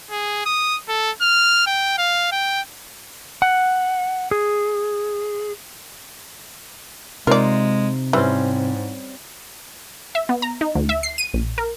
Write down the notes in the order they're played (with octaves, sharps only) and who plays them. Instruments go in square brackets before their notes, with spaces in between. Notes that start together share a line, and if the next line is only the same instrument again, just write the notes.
[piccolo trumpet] G#4
D#6
A4
F6
G5
F5
G5
[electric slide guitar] F#5
G#4
[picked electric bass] C3 [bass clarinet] G#3 [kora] D#4 F4 [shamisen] A#4 D5
[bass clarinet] G#2 [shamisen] E3 [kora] G3 C4 C#4
[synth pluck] E5
B3
A#5
D#4
D2
E5
C7
D#7
A#1
A#4